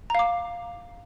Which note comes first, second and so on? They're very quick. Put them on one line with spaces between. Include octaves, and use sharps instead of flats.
A#5 F5 D6